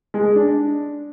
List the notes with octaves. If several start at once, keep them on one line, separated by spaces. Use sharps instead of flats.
G#3
D4